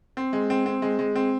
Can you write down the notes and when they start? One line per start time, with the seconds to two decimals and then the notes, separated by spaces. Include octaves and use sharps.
0.17 C4
0.33 G#3
0.50 C4
0.66 C4
0.82 G#3
0.99 G#3
1.15 C4